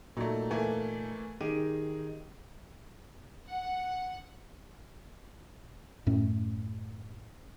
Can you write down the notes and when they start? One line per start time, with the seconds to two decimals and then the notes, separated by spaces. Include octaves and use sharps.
0.17 A#2 F#3 A3 D#4
0.51 E3 A3 A#3 G#5
1.41 D#3 D#4 G4 G#4 D#7
3.47 F#5
6.06 F#2 A2 A3 C#4